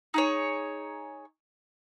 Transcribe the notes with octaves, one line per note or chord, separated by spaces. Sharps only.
D#4 G#4 C#5